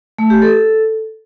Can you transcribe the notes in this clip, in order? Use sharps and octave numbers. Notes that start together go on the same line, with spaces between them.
A3
G4
A4